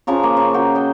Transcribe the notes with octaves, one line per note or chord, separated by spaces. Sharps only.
C#3 F3 A#5 C#6
A#3
C#3 C#6
F#4 A#4 G5
D#5 G5